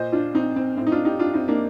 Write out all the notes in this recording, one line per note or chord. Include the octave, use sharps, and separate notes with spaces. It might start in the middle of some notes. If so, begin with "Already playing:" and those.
Already playing: A#2 C5 D#5
D4 F4
C4 D#4
C4
A2 C4
D#4
D4 F4
D#4 G4
D4 F4
C4 D#4
A#3 D4